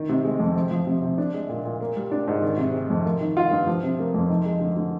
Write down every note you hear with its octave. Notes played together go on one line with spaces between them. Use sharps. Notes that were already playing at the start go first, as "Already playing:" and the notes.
Already playing: D#3
C3
G#3
F2
C4
F3
C3
C3
D4
G#3
A#2
A#2
A#3
G3
D4
G#2
D#3
C3
G#3
F2
A#3
D#3
F4
G2
F3
C3
A#3
F2
D#4
G#3
D3
D3